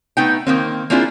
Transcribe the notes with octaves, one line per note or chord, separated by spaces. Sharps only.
A3 B3 D#4 G5
D#3 A#3 C4
A#3 C4 D4 E4 F4 G#4